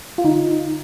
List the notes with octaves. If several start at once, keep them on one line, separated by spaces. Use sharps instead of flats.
F4
D3 D#4